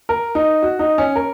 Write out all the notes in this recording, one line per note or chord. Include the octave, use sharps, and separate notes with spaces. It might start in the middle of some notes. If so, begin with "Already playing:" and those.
A#4
D#4
F#4
D#4
C#4
A#4